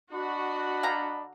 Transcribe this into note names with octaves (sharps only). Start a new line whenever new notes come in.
D4 F#4 D#5 B5
D3 F5 A#5